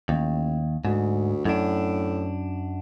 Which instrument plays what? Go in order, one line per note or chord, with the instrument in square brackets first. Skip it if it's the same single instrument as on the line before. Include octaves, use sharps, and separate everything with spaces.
[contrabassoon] A1 [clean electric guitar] D#2
[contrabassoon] D2 [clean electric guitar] G#2
[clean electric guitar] F#2 D4 [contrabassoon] A2